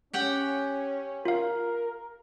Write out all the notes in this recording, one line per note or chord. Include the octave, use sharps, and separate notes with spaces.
C#4 G4 F#5 G5
F4 A#4 F5